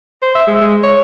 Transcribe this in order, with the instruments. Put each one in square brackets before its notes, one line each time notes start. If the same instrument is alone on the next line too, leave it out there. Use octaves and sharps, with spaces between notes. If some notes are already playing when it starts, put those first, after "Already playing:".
[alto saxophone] C5
E5
G#3
G#3
C#5